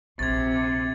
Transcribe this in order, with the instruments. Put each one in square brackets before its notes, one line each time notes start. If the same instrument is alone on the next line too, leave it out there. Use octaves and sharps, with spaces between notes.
[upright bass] A#1 [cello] C3 [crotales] G#6 A6